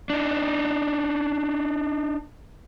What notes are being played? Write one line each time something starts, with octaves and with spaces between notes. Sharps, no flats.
D4 D#4